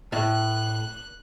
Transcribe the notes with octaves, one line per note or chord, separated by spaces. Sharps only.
A2 F#6